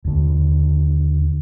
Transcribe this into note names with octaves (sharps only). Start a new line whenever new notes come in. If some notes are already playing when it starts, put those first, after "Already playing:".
D#2 D3